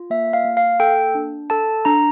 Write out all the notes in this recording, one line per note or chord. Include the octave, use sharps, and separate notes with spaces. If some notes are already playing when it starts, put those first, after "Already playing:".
Already playing: F4
A#3 E5
F5
A#3
F5
A4 G5
D4
A4 A5
D4 A#5